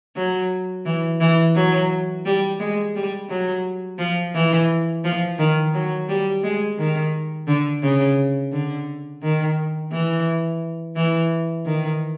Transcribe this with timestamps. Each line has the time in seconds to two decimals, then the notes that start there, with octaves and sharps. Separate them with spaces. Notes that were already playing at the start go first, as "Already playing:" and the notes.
0.16 F#3
0.86 E3
1.21 E3
1.55 F#3
2.26 G3
2.59 G#3
2.95 G3
3.29 F#3
3.99 F3
4.34 E3
5.04 F3
5.39 D#3
5.74 F#3
6.09 G3
6.43 G#3
6.78 D#3
7.47 D3
7.83 C#3
8.53 D3
9.22 D#3
9.92 E3
10.96 E3
11.66 D#3